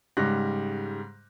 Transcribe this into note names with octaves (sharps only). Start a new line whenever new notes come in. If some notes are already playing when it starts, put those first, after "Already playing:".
G#2 C#3 G3 G4 F#6 A#6